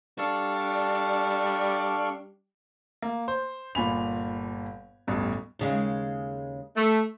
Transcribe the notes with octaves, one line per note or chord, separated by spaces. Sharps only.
G3 D4 A4 F5 C#6
A#3
C5
G1 A#2 F4 G#5 B5 F7
A1 D2 G2 B2
D#2 C#3 G#3
A3